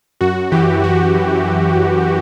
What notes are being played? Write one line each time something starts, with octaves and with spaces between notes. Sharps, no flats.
F#2 F#4
E3 G4
E3 F#4
E3
E3
F#2